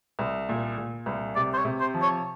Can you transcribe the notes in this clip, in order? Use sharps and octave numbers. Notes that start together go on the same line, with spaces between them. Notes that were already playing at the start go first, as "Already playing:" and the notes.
C2
A#2
A#2
C2
C3 D5
C5
C#5
C3
C5
F3
C#5